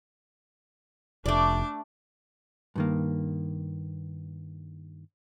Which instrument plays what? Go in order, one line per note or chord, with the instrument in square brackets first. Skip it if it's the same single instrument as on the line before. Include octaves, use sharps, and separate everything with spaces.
[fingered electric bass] F1 [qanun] A3 D5 [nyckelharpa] D4 D6
[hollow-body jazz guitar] G2 D#3 A#3